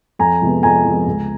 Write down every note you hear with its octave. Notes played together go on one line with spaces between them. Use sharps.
F2 G#5 A#5
C3 F3 G#3 B3
F2 G#5 A#5
C3 F3 G#3 B3
C#2